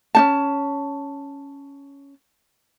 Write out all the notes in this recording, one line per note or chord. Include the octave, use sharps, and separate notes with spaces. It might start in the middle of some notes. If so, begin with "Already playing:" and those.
C#4 D#4 A5